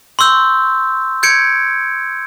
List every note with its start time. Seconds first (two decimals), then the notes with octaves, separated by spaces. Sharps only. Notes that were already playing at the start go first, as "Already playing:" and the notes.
0.19 C6 C#6 E6 G6
1.23 G6 G#6 C#7 D7